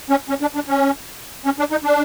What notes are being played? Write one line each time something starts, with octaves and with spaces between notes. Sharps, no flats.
C#4
C#4
D4
D4
C#4
C#4
D4
D#4
D4